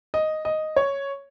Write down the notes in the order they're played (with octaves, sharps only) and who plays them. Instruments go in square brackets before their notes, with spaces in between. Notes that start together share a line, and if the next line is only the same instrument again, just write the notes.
[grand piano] D#5
D#5
C#5